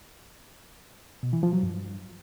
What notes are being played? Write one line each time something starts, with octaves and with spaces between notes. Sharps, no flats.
B2
E3
F3
F#3
G2